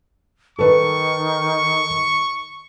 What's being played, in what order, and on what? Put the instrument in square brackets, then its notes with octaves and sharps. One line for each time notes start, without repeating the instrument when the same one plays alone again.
[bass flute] D#3 [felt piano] A4 B4 [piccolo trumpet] C#6